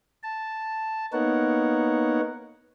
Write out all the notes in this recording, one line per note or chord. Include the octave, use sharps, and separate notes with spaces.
A5
A#3 B3 D#4 A#4 C#5 F#5